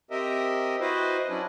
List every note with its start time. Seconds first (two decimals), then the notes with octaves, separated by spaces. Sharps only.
0.11 C4 G4 A#4 D#5 E5
0.81 E4 F#4 B4 C5 D#5
1.29 F#3 C#4 D4 E4